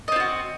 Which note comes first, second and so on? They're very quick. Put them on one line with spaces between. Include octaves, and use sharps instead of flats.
D#5 C4 F4 F#4